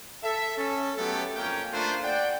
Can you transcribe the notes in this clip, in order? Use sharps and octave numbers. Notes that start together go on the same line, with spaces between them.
A4 E5
C#4 A4
F#3 A3 B3 G4 A4
F2 A#3 C#4 G5
A3 A#3 D4 F4 C5
D5 F#5 G5